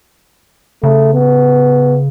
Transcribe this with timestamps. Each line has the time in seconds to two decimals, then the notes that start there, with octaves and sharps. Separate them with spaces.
0.83 C#3 A3
1.14 B3